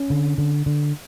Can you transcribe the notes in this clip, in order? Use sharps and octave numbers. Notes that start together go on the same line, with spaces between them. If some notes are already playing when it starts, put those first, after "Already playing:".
Already playing: C#4
D3
D3
D3